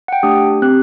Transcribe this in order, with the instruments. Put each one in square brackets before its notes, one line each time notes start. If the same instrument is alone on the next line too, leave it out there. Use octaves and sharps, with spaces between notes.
[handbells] F#5
G5
A3 D4 G4 D#6
C4 G4 F#6